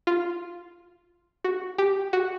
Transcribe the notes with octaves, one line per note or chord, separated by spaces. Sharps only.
F4
F#4
G4
F#4